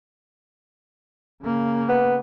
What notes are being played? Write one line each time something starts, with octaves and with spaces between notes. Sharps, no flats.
C#3 A#3
B3